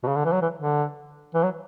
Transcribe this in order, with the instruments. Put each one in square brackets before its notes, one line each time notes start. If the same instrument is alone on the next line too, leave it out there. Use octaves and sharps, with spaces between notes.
[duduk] B2
C#3
D3
E3
F#3
E3
D3
E3
F#3